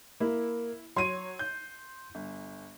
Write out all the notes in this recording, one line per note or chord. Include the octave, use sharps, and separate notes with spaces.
A#3 E4
F#3 C#5 C6 D#7
G6
G1